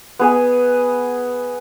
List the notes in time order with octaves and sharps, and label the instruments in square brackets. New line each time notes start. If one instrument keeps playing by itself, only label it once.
[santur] B3 G#4 G#5